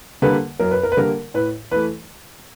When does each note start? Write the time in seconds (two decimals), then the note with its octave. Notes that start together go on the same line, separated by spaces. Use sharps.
0.22 D3 G3 A#3 B4
0.59 F#2 A#4
0.71 B4
0.83 A#4
0.92 B4
0.97 D3 G3 A#3 A#4
1.34 A2 B4
1.71 E3 A3 B4